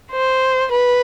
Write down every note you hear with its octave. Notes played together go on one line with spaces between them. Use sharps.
C5
B4